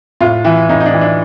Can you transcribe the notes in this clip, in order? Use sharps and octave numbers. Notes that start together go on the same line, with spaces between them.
A2 F4
E3 E4
A2 D#4
D#4
D4
E3
D4